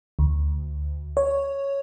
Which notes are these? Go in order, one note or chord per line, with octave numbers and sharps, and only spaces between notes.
D2
C#5